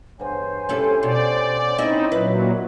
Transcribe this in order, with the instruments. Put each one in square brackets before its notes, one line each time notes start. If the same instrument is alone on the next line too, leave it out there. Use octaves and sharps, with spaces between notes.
[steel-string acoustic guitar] E2 G2 [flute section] C5 C#5 G#5
[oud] G2 E4 A4 [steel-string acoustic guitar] C#4 G4
[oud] B2 [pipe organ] D5
[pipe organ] C4 D#4 [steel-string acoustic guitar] C#4 D#5 [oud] E4 E5
[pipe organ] A#2 F#3 [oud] B4 [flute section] E5